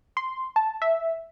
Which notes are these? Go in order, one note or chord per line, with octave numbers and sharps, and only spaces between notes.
C6
A5
E5